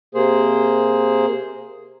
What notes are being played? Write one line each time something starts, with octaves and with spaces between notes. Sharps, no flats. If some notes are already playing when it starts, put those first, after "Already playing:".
C3 A#3 G#4 C5